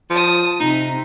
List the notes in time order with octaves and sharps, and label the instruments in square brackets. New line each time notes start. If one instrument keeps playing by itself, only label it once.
[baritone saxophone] F3 [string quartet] A5 D#6
[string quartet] C3 [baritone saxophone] D#4